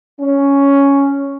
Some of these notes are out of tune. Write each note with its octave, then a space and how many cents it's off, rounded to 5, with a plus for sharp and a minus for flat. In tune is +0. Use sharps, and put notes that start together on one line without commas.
C#4 +5